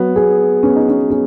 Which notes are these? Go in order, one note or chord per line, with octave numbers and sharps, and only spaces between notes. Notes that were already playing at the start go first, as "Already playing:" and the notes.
Already playing: F#3 B3
G#4
B3 C#4
D#4
C#4
C#4 G#4